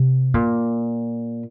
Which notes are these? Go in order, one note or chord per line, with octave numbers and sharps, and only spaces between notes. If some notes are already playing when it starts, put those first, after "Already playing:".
Already playing: C3
A#2